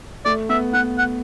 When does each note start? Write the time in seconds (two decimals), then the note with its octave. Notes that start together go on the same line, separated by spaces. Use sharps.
0.25 A3 D5
0.49 B3 E5
0.73 B3 F#5
0.98 F#5